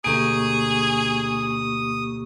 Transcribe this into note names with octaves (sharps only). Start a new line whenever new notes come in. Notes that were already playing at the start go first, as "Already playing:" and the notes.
D2 B2 A#3 G4 G#4 C#6 D#6 D7